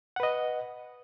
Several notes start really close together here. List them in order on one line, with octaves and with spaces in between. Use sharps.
F#5 B4 D#5